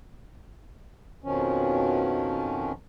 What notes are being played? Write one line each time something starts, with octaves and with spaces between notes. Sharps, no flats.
F2 B2 D#3 F3 C#4